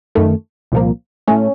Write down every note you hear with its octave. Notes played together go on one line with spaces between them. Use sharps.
F#2 D#3 A3
C2 A#2 F3 A#3
A2 A3 C#4